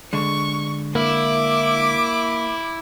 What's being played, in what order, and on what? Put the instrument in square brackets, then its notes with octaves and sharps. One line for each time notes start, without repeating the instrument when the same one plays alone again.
[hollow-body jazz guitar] D3 G#3 [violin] C#6
[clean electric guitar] A#3 [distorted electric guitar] E4 [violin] D6